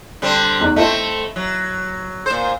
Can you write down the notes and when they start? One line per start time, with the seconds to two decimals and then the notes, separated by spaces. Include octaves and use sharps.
0.22 D3 G3 C4
0.60 E2 D#4 F#6
0.76 A3 C4 E4 D#5
1.36 F#3
2.26 A#2 C5